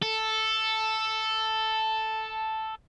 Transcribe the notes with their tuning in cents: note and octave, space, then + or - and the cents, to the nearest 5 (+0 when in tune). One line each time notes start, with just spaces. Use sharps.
A4 +0